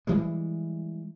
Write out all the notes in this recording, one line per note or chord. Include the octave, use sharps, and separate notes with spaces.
E3 G3 G#3